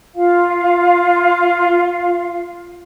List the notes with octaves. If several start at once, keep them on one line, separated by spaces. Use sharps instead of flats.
F4 F5